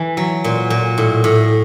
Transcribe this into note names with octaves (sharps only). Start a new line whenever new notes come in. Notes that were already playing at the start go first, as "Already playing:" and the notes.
Already playing: E3
F#3
A#2
A#2
A2
A2